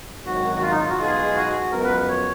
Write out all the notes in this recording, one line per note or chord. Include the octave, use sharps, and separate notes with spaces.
G#1 F#2 D#3 F#3 F#4
F#4
F4
D#4
F4
F#4
B1 B2 G#3 D#4 F4 G#4
F#4
F#2 F3 G#3 B3 A#4
B4
C#5